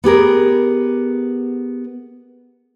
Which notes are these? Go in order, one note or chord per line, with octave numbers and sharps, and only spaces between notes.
B3 G4 G#4 A#4